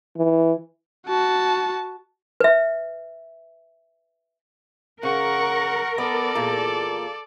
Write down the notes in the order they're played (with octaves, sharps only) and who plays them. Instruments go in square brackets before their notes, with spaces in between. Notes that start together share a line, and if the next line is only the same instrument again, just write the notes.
[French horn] E3
[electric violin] F#4 A5
[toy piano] B4 E5
[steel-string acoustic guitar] C#3 [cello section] A#4 [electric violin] F#5 C#6
[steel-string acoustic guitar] B3 [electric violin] A4 D5
[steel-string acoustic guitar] E2 A#2 A#3